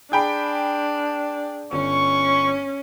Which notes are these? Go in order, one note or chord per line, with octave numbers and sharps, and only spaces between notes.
D4 G#4 G5 B5
G1 C#4 C#6